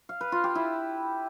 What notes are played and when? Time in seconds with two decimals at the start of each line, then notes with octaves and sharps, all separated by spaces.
0.09 F5
0.21 B4
0.32 F4
0.44 G4
0.55 E4